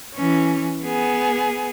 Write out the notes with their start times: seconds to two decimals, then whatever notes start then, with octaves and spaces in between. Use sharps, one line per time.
0.14 E3 C#4
0.84 B3 G#4